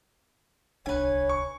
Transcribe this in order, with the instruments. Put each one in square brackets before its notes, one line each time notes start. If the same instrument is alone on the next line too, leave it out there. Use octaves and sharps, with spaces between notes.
[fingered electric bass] D1 C2 D4 [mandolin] B4 G#5 [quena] C#5
[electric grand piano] C#6